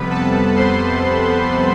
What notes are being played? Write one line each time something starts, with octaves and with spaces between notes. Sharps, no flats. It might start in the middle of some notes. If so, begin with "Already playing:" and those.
Already playing: F2 C3 G3 B3 B4 B5
A4 A5
C5 C6